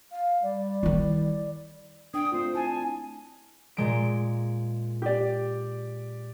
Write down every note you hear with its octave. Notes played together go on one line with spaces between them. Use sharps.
F5
G3 D5
D#3 E4
D4 G5 D#6
A3 C4 F4 C5
E4 G#5 A5
A#2 G#3 D7
G4 D5